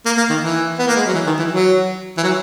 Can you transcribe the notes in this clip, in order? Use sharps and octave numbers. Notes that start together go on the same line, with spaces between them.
A#3
A#3
D#3
E3
B3
A#3
G#3
F#3
E3
D#3
E3
F#3
E3
F#3